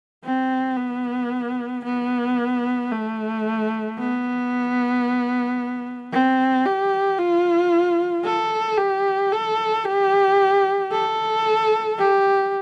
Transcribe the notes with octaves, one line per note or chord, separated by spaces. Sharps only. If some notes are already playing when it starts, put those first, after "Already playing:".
C4
B3
B3
A3
B3
C4
G4
F4
A4
G4
A4
G4
A4
G4